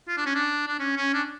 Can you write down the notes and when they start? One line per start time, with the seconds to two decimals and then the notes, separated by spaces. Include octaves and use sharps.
0.08 F4
0.17 D4
0.26 C#4
0.35 D4
0.67 D4
0.79 C#4
0.97 C#4
1.14 D4